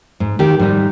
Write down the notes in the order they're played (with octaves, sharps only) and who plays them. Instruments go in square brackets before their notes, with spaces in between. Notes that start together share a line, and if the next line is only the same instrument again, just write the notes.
[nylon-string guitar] G#2
D#3 G4
G#2 G3 D#4